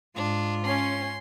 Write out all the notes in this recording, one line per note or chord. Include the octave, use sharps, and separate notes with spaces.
G#2 D4 F4
C#4 C6